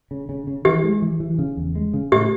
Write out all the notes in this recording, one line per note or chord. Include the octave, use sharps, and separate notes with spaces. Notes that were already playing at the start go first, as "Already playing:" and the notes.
C#3
C#3
C#3
E3 G4
G#3
E3
E3
C#3
E2
G#3
C#3
A2 G4